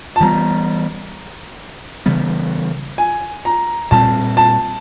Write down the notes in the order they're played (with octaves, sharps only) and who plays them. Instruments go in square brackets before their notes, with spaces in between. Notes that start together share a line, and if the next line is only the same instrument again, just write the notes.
[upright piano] A5
[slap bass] E3 G3 B3 [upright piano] A#5
[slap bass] C#3 E3 G3 B3
[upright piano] G#5
A#5
[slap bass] A#2 G3 C4 [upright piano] A5
[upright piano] A5